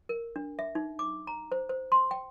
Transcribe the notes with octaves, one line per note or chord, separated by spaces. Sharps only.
A#4
D4
E5
D#4
D6
A#5
C5
C5
C6
G5